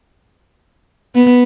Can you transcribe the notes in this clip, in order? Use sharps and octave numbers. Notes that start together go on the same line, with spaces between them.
B3